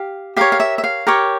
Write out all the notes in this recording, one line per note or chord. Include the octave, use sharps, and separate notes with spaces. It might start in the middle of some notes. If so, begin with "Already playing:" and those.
Already playing: G4 F5
G4 A#4 C#5 F5
F5
E5
E5
F5
G4 A#4 C#5 C#6